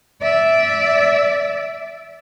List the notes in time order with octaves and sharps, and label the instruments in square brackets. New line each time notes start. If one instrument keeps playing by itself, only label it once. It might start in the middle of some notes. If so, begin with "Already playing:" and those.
[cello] D5 E5